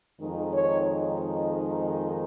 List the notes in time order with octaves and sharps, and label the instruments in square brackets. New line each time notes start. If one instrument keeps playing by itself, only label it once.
[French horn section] F2 D#3 G#3 D#4
C#5